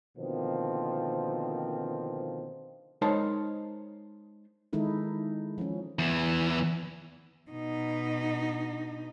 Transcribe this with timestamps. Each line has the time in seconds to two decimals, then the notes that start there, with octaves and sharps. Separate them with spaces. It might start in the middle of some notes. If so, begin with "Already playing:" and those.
0.18 B2 D3 D#3 F3 A#3 C4
3.02 G#3 D#4 A#4 C5 C#5 A5
4.73 D#3 G#3 D#4 E4 A4
5.58 F3 C#4
5.99 E2 E3
7.51 B2 D#4